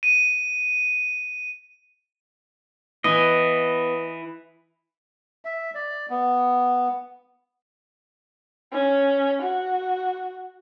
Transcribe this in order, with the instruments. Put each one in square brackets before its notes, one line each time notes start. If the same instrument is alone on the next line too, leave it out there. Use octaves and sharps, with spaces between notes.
[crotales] D#7
[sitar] E3 [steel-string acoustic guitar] B3 [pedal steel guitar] D#5
[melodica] E5
D5
B3
[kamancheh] C#4
F#4